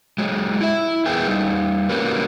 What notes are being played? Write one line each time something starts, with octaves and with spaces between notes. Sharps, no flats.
F#3 G#3
E4 E5
E2 B3 G#4 G5 G#5
G3 D#4
A#3 C#4 F#4 G4 A#4 B4